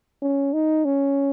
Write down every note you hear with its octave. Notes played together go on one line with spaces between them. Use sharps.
C#4
D#4
C#4